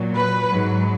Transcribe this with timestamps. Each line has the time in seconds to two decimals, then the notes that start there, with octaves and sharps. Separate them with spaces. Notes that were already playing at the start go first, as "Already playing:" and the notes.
Already playing: A#2 F#3
0.13 B4
0.48 G#2 F#3